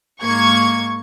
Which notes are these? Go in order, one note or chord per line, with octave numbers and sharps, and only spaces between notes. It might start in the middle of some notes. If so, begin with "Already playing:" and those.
G#2 A#3 C#6 G#6